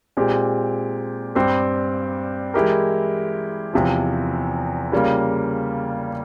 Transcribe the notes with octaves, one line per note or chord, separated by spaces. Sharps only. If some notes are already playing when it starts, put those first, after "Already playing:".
A#2 G#3 C4 G4
G2 G3 C4 G4
E3 G#3 E4 G4 A#4
E2 C3 F3
C#3 G3 A#3 F4